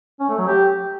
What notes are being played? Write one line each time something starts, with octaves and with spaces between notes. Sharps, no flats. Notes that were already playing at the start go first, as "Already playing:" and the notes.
C#4
A3
F#3
G4